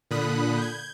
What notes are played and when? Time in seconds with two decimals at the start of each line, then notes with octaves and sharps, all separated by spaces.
0.11 A#2 D3 B5 D#6 F#6
0.58 G6 G#6